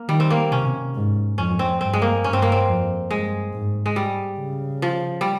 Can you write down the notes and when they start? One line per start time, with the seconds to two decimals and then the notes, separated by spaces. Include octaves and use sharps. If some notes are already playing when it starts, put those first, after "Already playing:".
Already playing: A#3
0.08 D#3 G3
0.20 C4
0.30 A#3
0.52 C3 C#4
0.94 G#2
1.38 F2 C#4
1.59 C4
1.81 G2 C4
1.93 G#3
2.02 A#3
2.24 G2 C#4
2.33 C4
2.42 A#3
2.52 C4
2.67 F2
3.09 G2 G#3
3.52 G#2
3.86 G#3
3.96 G3
4.39 C#3
4.82 F3
5.21 G3